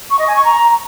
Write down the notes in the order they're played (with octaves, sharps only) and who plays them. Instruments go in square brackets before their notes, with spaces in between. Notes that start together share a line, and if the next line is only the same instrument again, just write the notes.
[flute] C#6
D#5
G#5
C#6
A#5